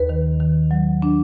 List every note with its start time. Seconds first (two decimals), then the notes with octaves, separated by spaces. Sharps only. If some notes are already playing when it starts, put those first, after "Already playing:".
Already playing: D#2 B4
0.09 D#3
0.40 D#3
0.71 F#3
1.02 D4